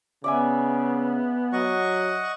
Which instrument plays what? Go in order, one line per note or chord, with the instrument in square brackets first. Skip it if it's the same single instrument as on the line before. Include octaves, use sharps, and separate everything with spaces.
[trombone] C#3 [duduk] B3 [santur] D5 E5 G#5
[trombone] F#3 [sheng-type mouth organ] D#5 F#5 C#6